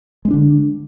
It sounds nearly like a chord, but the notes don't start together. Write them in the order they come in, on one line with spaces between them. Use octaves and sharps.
G#3 C4 D4 D3